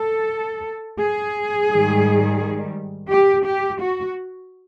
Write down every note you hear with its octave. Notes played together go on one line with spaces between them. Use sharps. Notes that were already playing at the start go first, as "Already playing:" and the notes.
Already playing: A4
G#4
G#2 D#3 G3
G4
G4
F#4